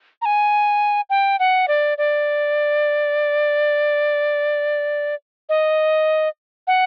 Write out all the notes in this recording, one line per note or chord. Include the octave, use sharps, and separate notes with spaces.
A#5
G#5
G5
F#5
D5
D5
D#5
F#5